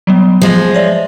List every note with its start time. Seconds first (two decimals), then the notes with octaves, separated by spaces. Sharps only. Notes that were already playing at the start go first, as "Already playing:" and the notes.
0.07 F#3 G3 B3
0.42 F3 G#3
0.74 C#5 D5 E5